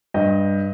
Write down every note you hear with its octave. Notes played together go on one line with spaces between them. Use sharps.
G2 D#5